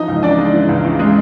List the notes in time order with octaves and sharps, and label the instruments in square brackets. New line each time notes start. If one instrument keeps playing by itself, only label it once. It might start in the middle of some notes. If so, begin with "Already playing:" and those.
Already playing: [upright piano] E3 F3 D#4 D#5
C#2
C#3 D4 D5
G#3
E3
C#2
C#3
G#3